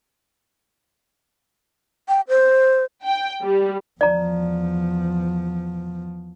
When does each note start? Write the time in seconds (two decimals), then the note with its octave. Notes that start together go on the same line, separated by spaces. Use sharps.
2.09 G5
2.29 C5
3.06 G5
3.41 G3
4.01 E2 F3 D5 A#5